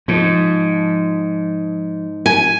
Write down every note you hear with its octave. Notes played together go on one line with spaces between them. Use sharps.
G#2 F3
G#5